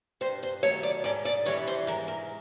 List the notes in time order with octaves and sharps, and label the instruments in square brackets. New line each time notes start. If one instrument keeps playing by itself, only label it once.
[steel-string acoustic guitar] G2 C5
C5
D#3 F#3 A3 C#5
D5
G#2 D5
D5
E3 G3 C#5
C5
G#2 A#4
A#4